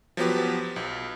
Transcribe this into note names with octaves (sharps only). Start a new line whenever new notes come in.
F3 F#3 B3 G4 B4
B1